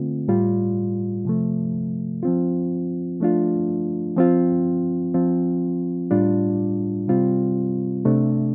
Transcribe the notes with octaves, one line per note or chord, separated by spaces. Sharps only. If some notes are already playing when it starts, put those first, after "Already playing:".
Already playing: D3 A3 C4 F4
A2 G3 F4
C3 F3 A3
F3 C4 F4
F3 A3 D4 F4
F3 C4 F4
F3 C4 F4
A2 G3 D4 F4
C3 G3 C4 F4
C3 A3 D4